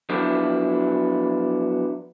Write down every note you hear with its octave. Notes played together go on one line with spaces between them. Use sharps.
F3 F#3 B3 D4 E4